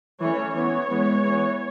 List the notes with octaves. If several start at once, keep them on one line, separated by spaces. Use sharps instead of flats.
E3 A3 C#4 C#5
E3 B3 C#5
E3 G#3 B3
E3 B3